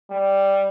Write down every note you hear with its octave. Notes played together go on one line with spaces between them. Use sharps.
G3